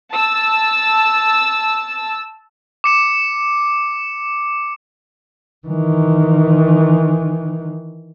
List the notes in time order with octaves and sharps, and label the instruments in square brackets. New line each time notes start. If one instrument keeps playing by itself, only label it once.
[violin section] A5 E6
[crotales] D6 C#7 E7
[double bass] D#3 E3